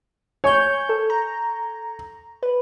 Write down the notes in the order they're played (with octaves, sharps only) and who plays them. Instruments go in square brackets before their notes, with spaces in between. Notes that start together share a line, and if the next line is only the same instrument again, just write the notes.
[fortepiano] C#5 [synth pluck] G#5 C#6 G6
[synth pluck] A4
A#5
B4